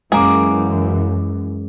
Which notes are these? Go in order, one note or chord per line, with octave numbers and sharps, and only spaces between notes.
F#2 E3 G#3 A#3 C#4 G#4 D6